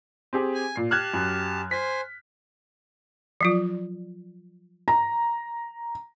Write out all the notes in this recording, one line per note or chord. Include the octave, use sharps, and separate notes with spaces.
C4 G4 G#4
G#5
A#2 C7
G4 A5 F6 F#6 G#6
F#2
C5 G#5 B6
F3 F#3 F4
A#5